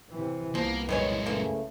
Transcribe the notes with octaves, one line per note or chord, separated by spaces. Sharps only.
C3 E3
C2 F3 A#3 B3
F#2 D#3 E3 G#3 C#5
C#3 E3 A3 A#3